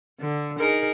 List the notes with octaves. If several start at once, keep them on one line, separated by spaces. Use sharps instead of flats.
D3
D#4 G#4 A#4